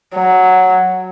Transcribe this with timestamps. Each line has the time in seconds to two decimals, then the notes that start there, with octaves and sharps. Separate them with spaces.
0.15 F#3